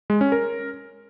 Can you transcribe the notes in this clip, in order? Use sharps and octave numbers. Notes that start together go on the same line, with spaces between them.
G#3
C#4
A#4